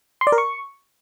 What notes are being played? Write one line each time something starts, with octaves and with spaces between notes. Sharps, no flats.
C6
D5
A#4
C#6